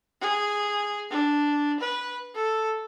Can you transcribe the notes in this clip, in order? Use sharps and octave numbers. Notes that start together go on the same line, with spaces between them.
G#4
D4
B4
A4